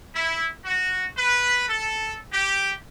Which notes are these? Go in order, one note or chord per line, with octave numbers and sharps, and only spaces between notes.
E4
F#4
B4
A4
G4